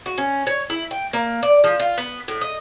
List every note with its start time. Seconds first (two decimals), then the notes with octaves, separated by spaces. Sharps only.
0.06 F#4
0.18 C#4
0.47 C#5
0.70 E4
0.91 G5
1.13 A#3
1.43 D5
1.64 F3
1.80 F4
1.98 B3
2.28 A2
2.41 D#5